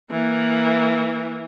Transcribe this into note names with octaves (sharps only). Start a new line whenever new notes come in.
E3 A#3